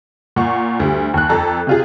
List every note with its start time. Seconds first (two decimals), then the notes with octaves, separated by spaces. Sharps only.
0.36 A#2 F#5 C#6
0.80 D2 G3
1.14 D#2 F#6
1.29 F2 A4 A#5
1.67 C3 F4 G#4